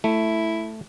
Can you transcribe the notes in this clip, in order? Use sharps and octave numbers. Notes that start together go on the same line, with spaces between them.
A3 E4